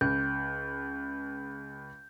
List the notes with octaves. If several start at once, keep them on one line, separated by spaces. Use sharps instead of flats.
C#2 G6